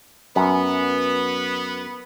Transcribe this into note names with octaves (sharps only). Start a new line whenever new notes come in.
F#2 B3